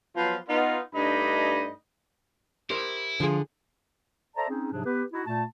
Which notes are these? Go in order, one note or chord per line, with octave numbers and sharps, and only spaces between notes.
F3 F#3 B3 F4 B4 C5
B3 D#4 F4
G2 A3 D4 D#4 D#5 B5
E4 G4 A#4 C5
D3 F3 F4 G#4
A4 C5 D5 E5 A5 A#5
C4 C#4 D#4 G#4
G#2 C3 F3 F#3 D4 G#4
B3 G4 B4
D#4 E4 F#4
A#2 A3 A5